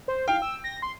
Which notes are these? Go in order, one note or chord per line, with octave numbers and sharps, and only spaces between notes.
C5
F5 G5
E6
A#6
C6